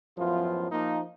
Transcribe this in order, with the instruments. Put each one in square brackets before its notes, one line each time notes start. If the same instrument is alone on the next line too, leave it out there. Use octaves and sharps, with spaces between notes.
[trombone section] A1 F#2 F3 B3 E4 F4
F3 A#3 D#4